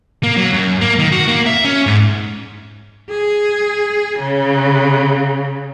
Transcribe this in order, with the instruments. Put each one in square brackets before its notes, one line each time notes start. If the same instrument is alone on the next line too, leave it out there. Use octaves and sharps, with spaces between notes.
[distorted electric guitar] A#3
F#3
F#2
A#3
D#3
F#4
A#3
E5
C#4
G#2
[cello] G#4
C#3